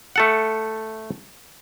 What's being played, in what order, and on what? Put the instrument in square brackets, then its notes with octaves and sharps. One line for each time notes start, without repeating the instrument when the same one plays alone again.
[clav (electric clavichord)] A3 A4 F#5